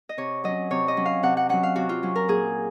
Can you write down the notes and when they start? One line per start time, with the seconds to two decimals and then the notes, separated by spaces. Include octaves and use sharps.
0.09 D#5
0.17 C3 C#5
0.44 F#3 C#4 D#5
0.70 C3 C#5
0.88 D#5
0.97 F#3 C#4
1.05 F5
1.23 C3 F#5
1.37 F#5
1.49 F#3 C#4 F#5
1.63 F5
1.76 C3 F#4
1.89 F4
2.03 F#3 C#4
2.16 A#4
2.28 A#2 G#4